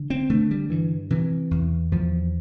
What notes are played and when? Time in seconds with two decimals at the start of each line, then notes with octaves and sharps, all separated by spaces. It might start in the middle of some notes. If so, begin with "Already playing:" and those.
Already playing: D3
0.10 C4
0.30 D3 A3
0.51 G3
0.70 G2 E3
1.10 C3 E3
1.51 E2
1.92 E2 F3